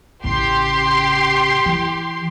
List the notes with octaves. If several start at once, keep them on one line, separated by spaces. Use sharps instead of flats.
A1 C#3 G4 C6
E3